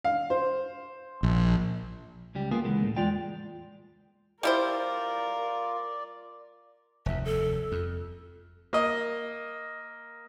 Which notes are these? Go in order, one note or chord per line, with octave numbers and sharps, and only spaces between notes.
F5
C5
A#1
C#2 G3 G4
A#3 B3 F4 G#4
C#2 E3 G#3 B3
A2
E2 G#3 F4 D5 G5
G3 E4 F4 A#4 C5 D5
F1 D#2 E5
A4
F2
A#3 D#5